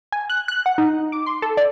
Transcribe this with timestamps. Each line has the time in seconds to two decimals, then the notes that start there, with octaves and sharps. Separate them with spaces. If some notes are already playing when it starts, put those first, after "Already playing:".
0.12 G#5
0.30 F#6
0.48 F#6
0.66 F#5
0.78 D#4
1.12 D6
1.26 C6
1.42 A4
1.57 D5